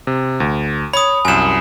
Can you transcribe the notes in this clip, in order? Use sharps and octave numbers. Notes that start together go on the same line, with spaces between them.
C3
D2
C#5 B5 D#6
C2 F#2 G#5 E7